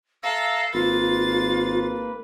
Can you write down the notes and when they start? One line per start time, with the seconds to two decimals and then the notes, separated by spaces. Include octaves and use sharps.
0.23 A4 E5 F5 A#5
0.74 G#1 A#3 F4 B4 A6